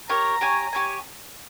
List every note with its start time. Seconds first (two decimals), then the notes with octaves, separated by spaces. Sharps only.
0.09 G4 A#4 C#5 A#5
0.41 G4 C#5 G#5
0.73 G4 C#5 G#5